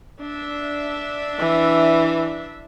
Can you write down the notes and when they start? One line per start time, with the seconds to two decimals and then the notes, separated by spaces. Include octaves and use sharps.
0.21 D4 E5
1.40 E3